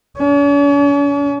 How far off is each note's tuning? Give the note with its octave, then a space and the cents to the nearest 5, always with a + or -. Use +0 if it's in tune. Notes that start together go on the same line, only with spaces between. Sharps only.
C#4 +45